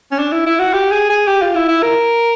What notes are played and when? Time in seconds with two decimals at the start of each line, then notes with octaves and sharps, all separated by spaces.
0.11 C#4
0.19 D4
0.32 E4
0.46 E4
0.60 F#4
0.73 G4
0.91 G#4
1.10 G#4
1.28 G4
1.42 F4
1.55 E4
1.68 E4
1.83 A#4